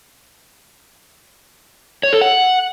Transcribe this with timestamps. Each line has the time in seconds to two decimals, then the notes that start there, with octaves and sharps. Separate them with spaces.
2.03 C#5
2.12 A4
2.21 F#5